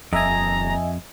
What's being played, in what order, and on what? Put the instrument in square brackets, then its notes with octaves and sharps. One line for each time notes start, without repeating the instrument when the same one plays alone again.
[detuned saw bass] D#1 [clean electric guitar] F2 [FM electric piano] D#5 E5 G#5 [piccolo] A#5